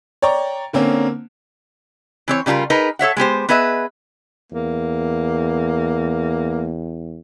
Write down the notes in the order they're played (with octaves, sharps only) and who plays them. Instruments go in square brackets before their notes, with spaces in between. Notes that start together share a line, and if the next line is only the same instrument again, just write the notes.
[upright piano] C#5 D5 G5 A#5 C#6
D3 A#3 C4 C#4
[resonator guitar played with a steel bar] E3 C4 C#5
C#3 G3 D4 F4 A#4
D#4 G#4 A#4 B4
A4 C#5 E5 F#5
G#3 B3 G4 C5
B3 G#4 B4 D#5 E5
[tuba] E2 [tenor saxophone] A#3